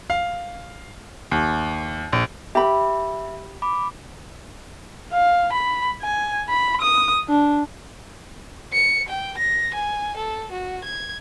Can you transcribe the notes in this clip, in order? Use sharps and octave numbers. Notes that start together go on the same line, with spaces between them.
F5
D#2
A#1
G4 E5 B5
B5 D6
F5
B5
G#5
B5
D#6
D4
C#7
G5
A#6
G#5
A4
F#4
G#6